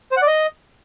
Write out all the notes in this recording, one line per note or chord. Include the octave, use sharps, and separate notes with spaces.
C5
F#5
D5
D#5